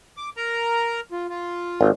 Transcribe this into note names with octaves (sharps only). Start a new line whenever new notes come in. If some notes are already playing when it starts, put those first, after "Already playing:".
D6
A#4 A#5
F4
F4
G#1